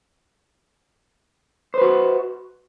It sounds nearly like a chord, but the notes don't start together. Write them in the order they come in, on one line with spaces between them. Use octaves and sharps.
C5 B4 F#4